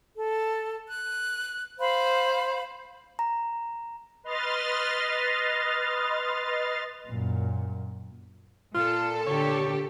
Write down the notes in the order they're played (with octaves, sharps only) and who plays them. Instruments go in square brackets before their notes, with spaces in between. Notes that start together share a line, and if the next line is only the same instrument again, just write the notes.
[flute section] A4
F#6
C5 F5 B5
[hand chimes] A#5
[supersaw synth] B4 D#5 C6 F6 A6
[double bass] F#2 A#2
[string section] A#2 A4 [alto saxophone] F4
[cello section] D3 G4 [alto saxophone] C#5